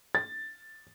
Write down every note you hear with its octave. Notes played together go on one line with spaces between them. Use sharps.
A6